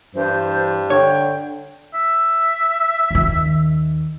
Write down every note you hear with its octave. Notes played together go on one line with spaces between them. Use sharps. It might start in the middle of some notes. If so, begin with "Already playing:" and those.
G2 E3 C5
D3 C#5 G5
E5
D#2 D#3